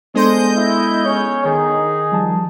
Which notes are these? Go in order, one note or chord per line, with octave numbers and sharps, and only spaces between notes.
G#3 B3 D4 A4 C5 D#5 G6
E4
C#4 C#5
D#3 D#4 G#4
F3 G3 A5